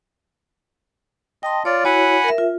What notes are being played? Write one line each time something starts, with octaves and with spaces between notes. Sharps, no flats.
D#5 G5 A5 C6
F4 C#5 D5
E4 F#4 C#5 F#5 G#5 B5
A#4 E5
F4